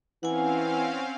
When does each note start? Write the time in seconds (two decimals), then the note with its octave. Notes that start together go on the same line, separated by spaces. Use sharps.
0.23 E3 C4 C#4 F5 F#5 G#5